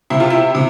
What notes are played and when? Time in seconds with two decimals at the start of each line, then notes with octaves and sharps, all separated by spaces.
0.10 C3 E4
0.20 F4
0.30 E4
0.55 C3